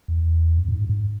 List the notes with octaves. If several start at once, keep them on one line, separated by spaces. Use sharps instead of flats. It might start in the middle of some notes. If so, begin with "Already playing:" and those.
E2
F#2
A2
G#2
F#2
G#2